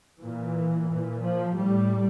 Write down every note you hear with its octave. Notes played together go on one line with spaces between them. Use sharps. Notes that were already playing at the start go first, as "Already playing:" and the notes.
A#2 E3
A#2
F3
A2 G3